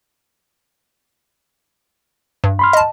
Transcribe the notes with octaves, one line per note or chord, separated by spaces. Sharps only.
G2
B5 C6 F6
D#5 A5